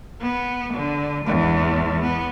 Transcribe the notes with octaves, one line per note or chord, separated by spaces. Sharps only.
B3
D3
E2 G#2
B3